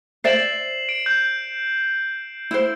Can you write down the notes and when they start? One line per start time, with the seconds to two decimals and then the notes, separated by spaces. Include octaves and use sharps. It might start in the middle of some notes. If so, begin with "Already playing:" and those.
0.24 C5 D5 E5 C7 E7 F#7
0.89 D7
1.06 G6
2.51 E4 C5